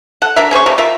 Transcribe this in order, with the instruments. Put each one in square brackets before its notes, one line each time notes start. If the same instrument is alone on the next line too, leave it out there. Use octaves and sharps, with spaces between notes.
[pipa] A4 F#5
F#3 D4 A#4 E5
C#4 G#4 C5 C#6
C3 G3 A3 A#3
F4 A#4 E5